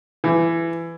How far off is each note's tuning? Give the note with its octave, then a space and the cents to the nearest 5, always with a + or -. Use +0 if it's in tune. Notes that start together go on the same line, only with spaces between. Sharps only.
E3 +15